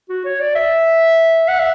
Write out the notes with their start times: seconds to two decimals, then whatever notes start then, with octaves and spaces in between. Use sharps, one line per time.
0.09 F#4
0.25 C#5
0.40 D5
0.55 E5
1.48 F#5
1.59 E5